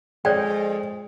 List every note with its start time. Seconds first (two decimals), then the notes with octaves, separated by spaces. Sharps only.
0.25 F2 G#3 G#4 C#5 D5 G5